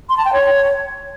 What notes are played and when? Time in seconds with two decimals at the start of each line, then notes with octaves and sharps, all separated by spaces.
0.09 C6
0.17 A5
0.25 G5
0.32 C#5